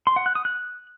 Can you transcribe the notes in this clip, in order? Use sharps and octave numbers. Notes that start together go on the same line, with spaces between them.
C6
F#5
F#6
D#6
F#6